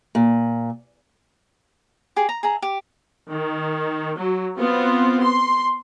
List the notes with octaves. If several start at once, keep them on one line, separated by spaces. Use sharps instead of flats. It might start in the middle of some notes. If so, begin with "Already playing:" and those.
A#2
G4 G#4
A#5
G#4 E5 A#5
G4
D#3
F#3
B3 C4 F4
C6